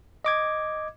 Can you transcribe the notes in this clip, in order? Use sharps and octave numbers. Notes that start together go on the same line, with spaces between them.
D#5 D6 G#6